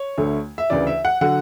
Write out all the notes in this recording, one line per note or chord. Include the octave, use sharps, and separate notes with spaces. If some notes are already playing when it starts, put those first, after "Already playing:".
Already playing: C#5
D2 D3 A3
E5
D2 C#3 E3 D5
E5
F#5
D3 F#3 F#5